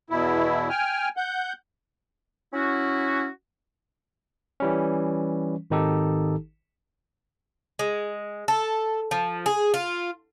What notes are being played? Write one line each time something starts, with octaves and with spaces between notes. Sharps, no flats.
E2 B2 E4
G5 G#5 F6
F#5 G6
C#4 E4 F#4
E3 G3 C#4
G#1 D#3 D#4 G4 A4
G#3
A4
F3
G#4
F4